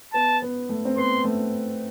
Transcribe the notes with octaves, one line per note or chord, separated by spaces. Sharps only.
B3 A5
B3
A3
C4
B3 C6
A3